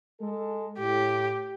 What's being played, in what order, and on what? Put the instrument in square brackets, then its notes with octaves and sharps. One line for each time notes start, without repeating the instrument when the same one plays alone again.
[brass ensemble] G#3 A4
[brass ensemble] A2 [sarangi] G4